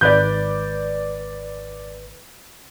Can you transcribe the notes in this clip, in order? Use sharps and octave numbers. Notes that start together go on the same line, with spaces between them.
G#1 B4 D5 G6